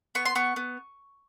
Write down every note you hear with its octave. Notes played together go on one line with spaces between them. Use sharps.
B3 C#6
C6
B3 C#6
B3